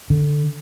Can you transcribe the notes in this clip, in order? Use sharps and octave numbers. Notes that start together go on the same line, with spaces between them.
D3